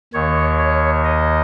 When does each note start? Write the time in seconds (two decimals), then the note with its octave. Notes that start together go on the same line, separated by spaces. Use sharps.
0.13 D#2 D#3 C#5
0.59 C#5
1.04 D#5